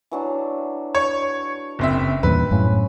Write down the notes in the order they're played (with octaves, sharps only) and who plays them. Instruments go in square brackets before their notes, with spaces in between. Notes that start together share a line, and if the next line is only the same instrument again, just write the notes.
[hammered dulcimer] E3 F#3 D4
[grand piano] C#5
F#1 C4 E5
[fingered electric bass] E2 G2 A#2 [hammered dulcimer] C4 [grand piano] B4
[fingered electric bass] F#2 A2 [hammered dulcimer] C#3